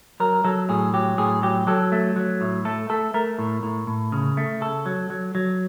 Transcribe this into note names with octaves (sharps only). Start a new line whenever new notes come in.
F#3 A#4
F#3 A4
A2 G#4
F#3 G4
A2 G#4
F#3 G4
F#3 A4
A3
F#3
A2
A3 A4
A3 A4
A3 A#4
A2
A2
A2
C#3
A3
C#3 A4
F#3
F#3
F#3